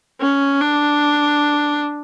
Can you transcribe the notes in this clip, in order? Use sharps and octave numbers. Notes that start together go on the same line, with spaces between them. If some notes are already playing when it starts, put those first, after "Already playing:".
C#4
D4